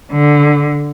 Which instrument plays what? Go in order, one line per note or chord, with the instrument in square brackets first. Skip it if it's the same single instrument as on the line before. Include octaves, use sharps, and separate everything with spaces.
[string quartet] D3